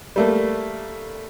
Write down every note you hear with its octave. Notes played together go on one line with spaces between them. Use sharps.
G3 A3 A#3